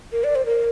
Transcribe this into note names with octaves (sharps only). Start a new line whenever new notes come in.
A#4
D5
C5
A#4